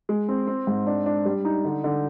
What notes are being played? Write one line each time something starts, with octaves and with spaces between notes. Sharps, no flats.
G#3
C4
C4
G#2
D4
D4
G3
D#4
D3
D3